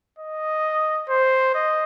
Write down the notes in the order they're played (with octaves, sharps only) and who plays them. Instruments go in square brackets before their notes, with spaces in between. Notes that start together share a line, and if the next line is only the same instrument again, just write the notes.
[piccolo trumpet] D#5
C5
D#5